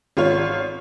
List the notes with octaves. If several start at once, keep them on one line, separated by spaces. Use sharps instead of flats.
G#1 F4 C#5